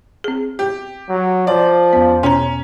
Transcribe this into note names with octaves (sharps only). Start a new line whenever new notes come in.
C4 G#4
G4
F#3
F3 D5
E2 B3
B2 C#4 A#5